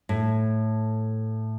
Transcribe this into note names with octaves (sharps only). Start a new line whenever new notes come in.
A2